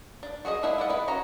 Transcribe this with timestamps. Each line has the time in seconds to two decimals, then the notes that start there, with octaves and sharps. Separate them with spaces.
0.23 D4
0.45 F#4 G#4 C5 D#5
0.63 A#3 E4 G#4 E5 F#5
0.78 E4 D5 D#5 F#5
0.89 E4 G#4 B4
1.08 C#4 F#4 A#5